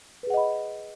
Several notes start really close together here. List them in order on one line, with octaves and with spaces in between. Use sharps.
B4 G#4 F#5 D#5 B5